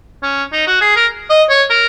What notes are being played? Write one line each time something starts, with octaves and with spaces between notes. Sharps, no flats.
C#4
D#4
F#4
G#4
A#4
D#5
C#5
A#4